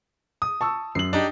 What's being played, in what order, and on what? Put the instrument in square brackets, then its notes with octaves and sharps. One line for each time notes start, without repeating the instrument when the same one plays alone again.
[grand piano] D#6
[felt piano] A5 C#6 E6
[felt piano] F#2 [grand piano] C7 F#7
[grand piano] D4 D#4 G4